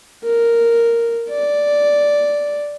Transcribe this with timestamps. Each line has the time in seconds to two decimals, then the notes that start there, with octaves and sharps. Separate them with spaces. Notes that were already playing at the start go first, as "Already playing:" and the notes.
0.24 A#4
1.29 D5